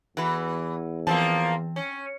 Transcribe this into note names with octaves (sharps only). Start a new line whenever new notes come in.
E2 E3 F#4 B4
E3 F3 A#3 C4 A5
C#4